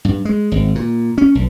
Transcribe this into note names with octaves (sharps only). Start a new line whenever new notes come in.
G2
G#3
G#1
A#2
C#4
B1